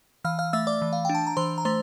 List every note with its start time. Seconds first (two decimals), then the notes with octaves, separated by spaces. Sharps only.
0.24 E3 F5 F6
0.39 F5 F6
0.53 A3 E5 E6
0.67 D5 D6
0.82 E3
0.93 F5
1.05 D4 G5
1.15 A5
1.27 A#5
1.37 E3 C5 C6
1.58 A#5
1.65 A3 C5 C6